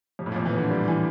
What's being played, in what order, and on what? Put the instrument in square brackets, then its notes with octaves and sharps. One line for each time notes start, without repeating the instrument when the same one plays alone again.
[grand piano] F2 [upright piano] C3
[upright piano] A2
A#2
[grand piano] F2
[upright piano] E3
[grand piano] F2 [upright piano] D3
[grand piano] G3
E3